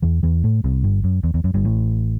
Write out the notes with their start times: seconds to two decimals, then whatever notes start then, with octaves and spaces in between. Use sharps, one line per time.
0.02 E2 E3
0.23 E2 E3
0.44 A2 A3
0.64 C2 C3
0.84 G1 G2
1.04 F#2
1.23 E2
1.34 E2
1.44 F#2
1.54 G1 G2
1.64 A1 A2